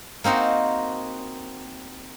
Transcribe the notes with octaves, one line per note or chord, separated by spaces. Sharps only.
A#3 C4 D#4 F#4 A#4